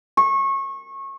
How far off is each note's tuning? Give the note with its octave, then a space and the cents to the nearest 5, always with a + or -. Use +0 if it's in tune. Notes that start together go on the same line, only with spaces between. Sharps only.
C#6 -25